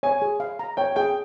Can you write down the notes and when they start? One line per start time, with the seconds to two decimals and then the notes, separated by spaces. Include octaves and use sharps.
0.03 C#5 G#5
0.22 G#4
0.40 F5
0.59 A#5
0.77 C#5 G5
0.96 G#4 G5